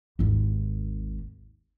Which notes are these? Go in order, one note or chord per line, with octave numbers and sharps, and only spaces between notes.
G#1 D#2